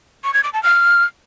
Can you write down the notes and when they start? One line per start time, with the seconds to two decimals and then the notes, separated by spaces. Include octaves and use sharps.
0.24 C#6
0.34 G#6
0.44 D6
0.53 A5
0.63 F6